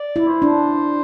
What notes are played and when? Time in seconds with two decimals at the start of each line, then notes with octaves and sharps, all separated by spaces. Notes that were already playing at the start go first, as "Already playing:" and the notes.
Already playing: D5
0.16 E4
0.29 C5
0.42 D4